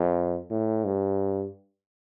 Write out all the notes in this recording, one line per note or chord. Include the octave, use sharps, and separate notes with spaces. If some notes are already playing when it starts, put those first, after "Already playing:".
Already playing: F2
A2
G2